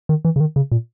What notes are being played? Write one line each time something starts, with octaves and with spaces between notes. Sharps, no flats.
D#3
E3
C#3
D#3
C#3
A#2